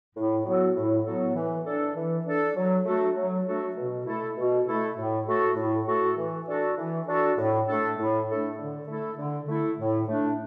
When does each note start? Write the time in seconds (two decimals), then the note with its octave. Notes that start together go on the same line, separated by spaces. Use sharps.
0.16 A2
0.45 F#3 B3 F#4 A4
0.75 A2
1.05 F#3 B3 F#4 A4
1.35 E3
1.65 D4 A4
1.96 E3
2.26 D4 A4
2.56 F#3
2.85 A3 D4 F#4 A4
3.16 F#3
3.46 A3 D4 F#4 A4
3.77 B2
4.06 A3 E4 A4
4.36 B2
4.66 A3 E4 A4
4.97 A2
5.27 A3 F#4 A4
5.56 A2
5.86 A3 F#4 A4
6.17 E3
6.47 D4 F#4 A4
6.77 E3
7.08 D4 F#4 A4
7.37 A2
7.67 A3 D4 A4
7.98 A2
8.27 A3 D4 A4
8.58 D3
8.87 A3 E4 A4
9.18 D3
9.48 A3 E4 A4
9.78 A2
10.08 A3 D4